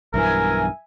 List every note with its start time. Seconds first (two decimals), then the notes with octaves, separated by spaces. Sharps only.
0.14 B1 G2 E3 A#4 E5 G#5